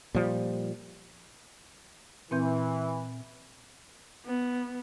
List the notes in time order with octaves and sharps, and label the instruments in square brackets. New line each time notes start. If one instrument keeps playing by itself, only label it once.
[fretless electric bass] A#2 F3 G3
[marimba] A#2 C4 G6 [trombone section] E3
[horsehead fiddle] B3